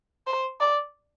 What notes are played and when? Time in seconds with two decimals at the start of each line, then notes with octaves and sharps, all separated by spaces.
0.27 C5
0.60 D5